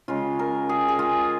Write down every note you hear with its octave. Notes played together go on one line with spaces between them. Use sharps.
C#3 G#3 F4
A#4
G#4
G#4
F4